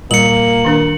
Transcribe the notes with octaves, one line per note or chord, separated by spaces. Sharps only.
A#2 G3 A#3 C#7 F#7
D#3 D4 A#4